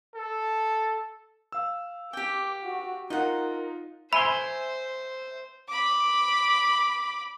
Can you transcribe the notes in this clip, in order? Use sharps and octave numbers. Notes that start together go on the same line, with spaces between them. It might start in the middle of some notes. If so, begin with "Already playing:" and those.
A4
F5 E6
G4 G5 D6
F#4
D#4 F4 A#4 D#5 F#5
C5 E5 G#5 B5 C6
B5 D6